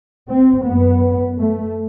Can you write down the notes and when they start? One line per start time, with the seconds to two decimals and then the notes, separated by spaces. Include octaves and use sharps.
0.27 C4
0.65 F#2 B3
1.38 A3